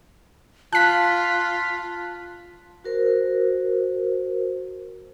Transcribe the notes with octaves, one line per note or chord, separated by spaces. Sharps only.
F4 A5 F#6 B6
F#4 A#4 C5